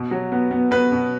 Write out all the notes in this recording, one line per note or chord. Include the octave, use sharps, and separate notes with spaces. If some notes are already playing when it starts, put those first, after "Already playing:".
Already playing: B2
F#3
B3
B3
B3 B4
B2